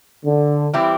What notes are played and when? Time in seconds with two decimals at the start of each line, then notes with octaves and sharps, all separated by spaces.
0.25 D3
0.73 E3 G3 C4 E4 G4